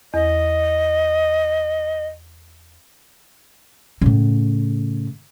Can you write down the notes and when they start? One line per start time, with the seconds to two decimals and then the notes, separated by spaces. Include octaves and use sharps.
0.14 E2 D#5
4.01 A2 C#3